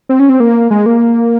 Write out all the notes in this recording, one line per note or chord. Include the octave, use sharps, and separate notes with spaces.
C4
C#4
C4
A#3
G#3
A#3